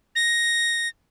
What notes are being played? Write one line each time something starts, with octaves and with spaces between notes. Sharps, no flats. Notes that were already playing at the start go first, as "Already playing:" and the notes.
A#6